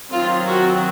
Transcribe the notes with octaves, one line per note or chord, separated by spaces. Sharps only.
D#3 F#3 C4 F4
F#4